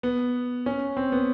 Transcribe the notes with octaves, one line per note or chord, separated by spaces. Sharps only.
B3
C#4
C4
B3